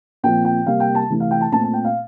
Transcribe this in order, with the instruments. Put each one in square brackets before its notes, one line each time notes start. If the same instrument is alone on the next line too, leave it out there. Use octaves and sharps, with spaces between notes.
[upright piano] A#2 F3 C4 G5
G5
C3 G3 A#3 F5
G5
A5
C3 E3 A3
F5
G5
A5
A#2 A3 C4 A5
A5
G5
F5